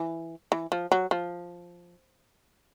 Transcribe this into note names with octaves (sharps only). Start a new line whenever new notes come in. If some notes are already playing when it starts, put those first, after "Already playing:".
Already playing: E3
E3
F3
F#3
F3